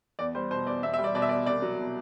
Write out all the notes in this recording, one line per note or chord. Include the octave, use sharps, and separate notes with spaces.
E2 D5
G3 C5
B2 C5
E2 D5
E2 E5
E5
G3
D5
B2 D5
E5
E2 D5
C2 D5
F#3
B2